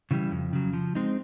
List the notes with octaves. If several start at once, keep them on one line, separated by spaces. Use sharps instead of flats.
C#3 E3 G3
F2
C#3 F#3
F3
G#3 C4 D#4